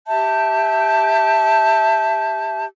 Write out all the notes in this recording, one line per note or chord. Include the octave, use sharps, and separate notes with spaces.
G4 E5 A5 G6